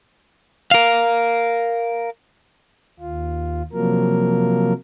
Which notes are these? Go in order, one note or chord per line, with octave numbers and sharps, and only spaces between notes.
A#4 F5
D#2 F4
C3 F3 F#3 A#3 A#4